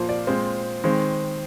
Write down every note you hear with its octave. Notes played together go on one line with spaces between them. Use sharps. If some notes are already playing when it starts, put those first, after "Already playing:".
Already playing: A#2 F3 A#3 C5
D5
A#2 G#3 C4 C5
D#3 G#3 C4